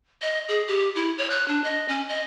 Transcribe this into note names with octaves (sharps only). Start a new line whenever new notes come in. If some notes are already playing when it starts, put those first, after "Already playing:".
D#5
G#4
G4
E4
C#5
F#6
D4
D#5
C#4
D#5